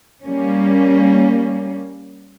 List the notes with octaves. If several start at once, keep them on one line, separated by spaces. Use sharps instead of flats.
G3 A#3 C#4